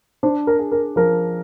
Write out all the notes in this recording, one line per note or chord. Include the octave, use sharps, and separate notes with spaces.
D4 C5
A#4
G#4
A#4
F3 A#4